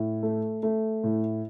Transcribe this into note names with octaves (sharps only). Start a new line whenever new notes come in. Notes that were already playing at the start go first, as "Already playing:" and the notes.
Already playing: A2
A3
A3
A2